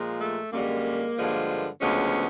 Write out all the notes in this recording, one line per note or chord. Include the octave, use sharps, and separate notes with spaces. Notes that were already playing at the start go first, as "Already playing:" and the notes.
Already playing: A#2 F3 G#3
A3
F#2 D3 G3 G#3 A#3
G2 D3 F3 G#3
D2 C#3 F3 G#3 B3 C#4